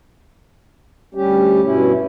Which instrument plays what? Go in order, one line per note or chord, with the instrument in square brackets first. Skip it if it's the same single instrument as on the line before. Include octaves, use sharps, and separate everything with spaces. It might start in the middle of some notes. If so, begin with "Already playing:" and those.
[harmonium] D2 G3 C#4 G4
G2 B2 C#4 E4